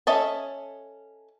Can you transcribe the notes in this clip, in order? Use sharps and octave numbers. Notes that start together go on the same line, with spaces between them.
C#4 A4 D#5 E5 A5